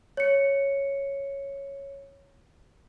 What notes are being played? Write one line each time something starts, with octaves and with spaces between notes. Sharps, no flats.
C#5 C#7